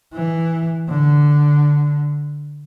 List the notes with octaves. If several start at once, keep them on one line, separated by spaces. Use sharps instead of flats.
E3
D3